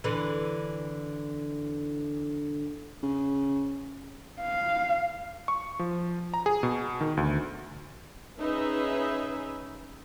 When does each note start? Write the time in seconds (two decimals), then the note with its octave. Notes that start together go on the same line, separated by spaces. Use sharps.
0.04 D3 E3
3.03 C#3
4.41 F5
5.48 C#6
5.79 F3
6.34 A#5
6.46 G#4
6.63 B2
7.01 D#3
7.17 D2
8.41 C#4 D#4 G#4 B4 E5